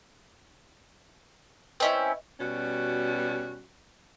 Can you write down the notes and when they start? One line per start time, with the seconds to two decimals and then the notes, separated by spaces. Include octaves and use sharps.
1.80 C4 C#4 E4 B4 D#5 E5
2.40 B2 G3 C#4 F#4